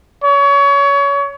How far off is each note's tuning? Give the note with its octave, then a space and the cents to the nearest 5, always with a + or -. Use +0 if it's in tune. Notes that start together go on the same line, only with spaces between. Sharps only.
C#5 +25